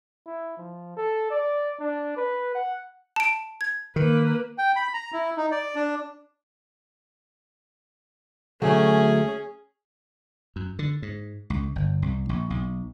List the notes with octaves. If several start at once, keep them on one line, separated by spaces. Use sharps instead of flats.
E4
F3
A4
D5
D4
B4
F#5
A5 D7
G#6
D#3 A#3 B4
G5
B5
A#5
E4
D#4
D5
D4
D2 F#3 A3 C#4 G#4
F#2
D3
G#2
C#2
G1
C2
A#1
B1